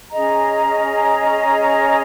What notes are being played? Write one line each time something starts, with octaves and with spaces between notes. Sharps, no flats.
C#4 G#4 D#5 A#5